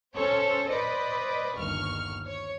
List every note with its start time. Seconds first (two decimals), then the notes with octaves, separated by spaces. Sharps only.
0.15 C#4 A4 C5 C#5
0.69 B4 C5 D5 D#5
1.58 G1 D#2 C#6 F6
2.25 C#5